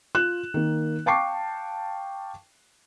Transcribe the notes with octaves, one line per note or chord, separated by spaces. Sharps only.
F4 F#6 E7
D#3 A#3
F5 G5 A5 C#6 D6 C7